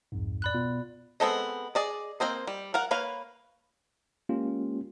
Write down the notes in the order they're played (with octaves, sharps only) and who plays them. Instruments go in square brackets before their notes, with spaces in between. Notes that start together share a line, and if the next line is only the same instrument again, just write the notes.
[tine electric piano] C2 F2 G#2
[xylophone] D5 B5 F#6
[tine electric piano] B2 B3 F4
[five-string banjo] G#3 B3 C4 A4 D#5
G#4 D5 D#5
A#3 C4 C5 D#5
G3
A#4 F5 F#5
A#3 B4 C#5 F5
[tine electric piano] G#3 A#3 C#4 F4 G4